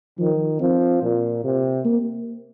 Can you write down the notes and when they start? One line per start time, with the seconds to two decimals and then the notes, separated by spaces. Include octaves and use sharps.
0.19 D#3 F3
0.60 F3 C4
1.02 A#2
1.44 C3
1.85 A#3